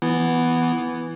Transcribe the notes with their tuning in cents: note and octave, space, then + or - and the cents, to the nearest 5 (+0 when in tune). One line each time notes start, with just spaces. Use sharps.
E3 +0 B3 +0 E4 +0